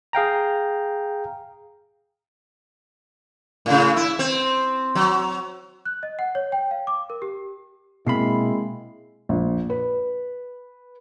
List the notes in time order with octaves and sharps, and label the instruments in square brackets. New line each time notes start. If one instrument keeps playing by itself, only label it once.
[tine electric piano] G#4 F5 G5 A#5
[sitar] A2 C#3
E4
C4
F#3
[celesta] F#6
D#5
F#5
C#5
G5
F5
D6
A#4
G4
[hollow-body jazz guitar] B2 B5 [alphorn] G#3 [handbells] A#3 C4 C7 [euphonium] E4
[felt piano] A#1
B4